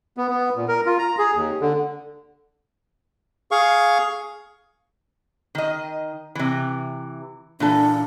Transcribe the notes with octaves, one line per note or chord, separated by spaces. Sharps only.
B3
B3
A#2
A#4
F4
A#5
G#4
D#2
D3
G#4 F5 C#6
D#3 D#5
C3 E3
A#2 E3 D4 A4